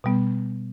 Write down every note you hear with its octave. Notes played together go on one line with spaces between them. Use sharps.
B2 G3 B3